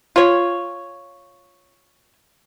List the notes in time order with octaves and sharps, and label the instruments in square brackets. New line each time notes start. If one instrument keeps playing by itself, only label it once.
[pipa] F4 C#5